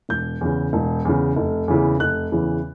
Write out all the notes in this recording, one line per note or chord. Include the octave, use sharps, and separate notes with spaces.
E1 G6
E2 C#3
E1
E2 C#3
F1
E2 C#3 E3
F1 F#6
E2 C#3 E3